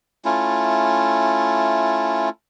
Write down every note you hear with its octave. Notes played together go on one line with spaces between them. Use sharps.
A3 C#4 E4 F4